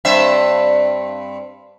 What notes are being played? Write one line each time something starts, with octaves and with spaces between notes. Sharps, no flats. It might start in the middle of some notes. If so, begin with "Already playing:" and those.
G2 C4 E5